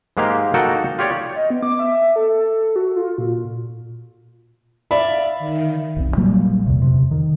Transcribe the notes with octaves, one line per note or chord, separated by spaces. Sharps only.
G#2 G#3 A#3 G4 F5
A#3 D#4 F#4 A4 F#5 G5
F4 G4 C#5 D5
D#5
B3
D6
E5
A4
F#4
F4
A#2
D5 E5 F5 B5
D#3
E1 B1 C4
A#2 F#3 G3 A#3
E2 C3
F2 C3
D#3